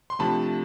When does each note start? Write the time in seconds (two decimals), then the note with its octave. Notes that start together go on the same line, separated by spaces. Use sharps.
0.10 C6
0.19 C3 F3 A3 D4 A5 B5